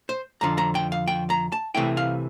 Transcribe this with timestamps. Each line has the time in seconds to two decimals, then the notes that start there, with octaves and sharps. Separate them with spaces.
0.09 C5
0.41 F2 D3 F3 A#5
0.58 A#5
0.75 G5
0.92 F5
1.08 G5
1.30 A#5
1.52 A5
1.75 C2 C3 E3 A3 E4 G5
1.97 F5